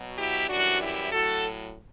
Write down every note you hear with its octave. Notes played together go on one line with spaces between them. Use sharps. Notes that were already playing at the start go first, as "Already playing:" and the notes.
Already playing: B2 F#3
E4 G4
F#2 E3 G3 D4 F#4
E4 G4
A2 F#3 F#4 A4